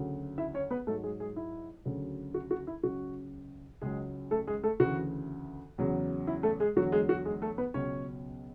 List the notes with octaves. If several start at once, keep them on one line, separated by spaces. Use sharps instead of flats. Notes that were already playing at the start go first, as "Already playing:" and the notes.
Already playing: D2 C#3 F#3
E4 E5
C#4 C#5
B3 B4
G#2 F#3 A3 A4
G#3 G#4
G#3 G#4
E4
D2 C#3 F#3
F#4
F#4
E4
C#2 C#3 F#3 F#4
C#2 C#3 F#3 G#3 G#4
A3 A4
G#3 G#4
A3 A4
D2 C#3 E3 F#4
E2 C#3 F#3
E4
A3 A4
G#3 G#4
E2 D3 F#3 F#4
G#3 G#4
F#4
G#3 G#4
A3 A4
B3 B4
C#2 B2 F#3 C#4 C#5